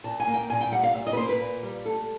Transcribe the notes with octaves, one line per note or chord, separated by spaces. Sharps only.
A#2 A5
G#5
A#3
G5
A#2 G#5
G5
G3 F#5
F5
A#2 E5
D#5
B4
A#3 C5
B4
A#2
G3
A3 A4